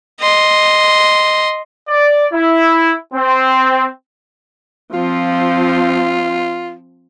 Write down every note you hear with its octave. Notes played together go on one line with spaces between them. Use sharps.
D#5 C6
D5
E4
C4
F3 C4 F4